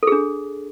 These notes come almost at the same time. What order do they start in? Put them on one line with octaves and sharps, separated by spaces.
A4 G#4 D4